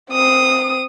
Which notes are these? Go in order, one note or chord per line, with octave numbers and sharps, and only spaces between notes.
C4 D#6